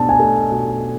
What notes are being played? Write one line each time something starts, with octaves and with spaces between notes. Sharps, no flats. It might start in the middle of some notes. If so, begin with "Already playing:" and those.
Already playing: B1 B2 D4 A5
G#5
A3
B1